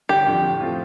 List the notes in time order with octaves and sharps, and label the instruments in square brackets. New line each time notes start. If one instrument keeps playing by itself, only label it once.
[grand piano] G1 [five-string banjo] G4
[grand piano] F2 D3 F3
A2
F3 A3 C4 F4